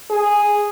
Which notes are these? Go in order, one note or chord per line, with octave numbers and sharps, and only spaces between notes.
G#4